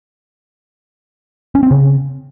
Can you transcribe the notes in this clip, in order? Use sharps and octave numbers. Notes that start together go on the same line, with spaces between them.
C#4
C4
C#3